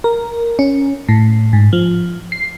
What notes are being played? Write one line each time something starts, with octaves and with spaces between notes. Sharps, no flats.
A#4
C#4
A2
G#2
F3
C7